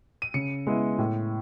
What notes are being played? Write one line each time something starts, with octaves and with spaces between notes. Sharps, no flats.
D#7
C#3 C#7
G#3 B3 E4
A2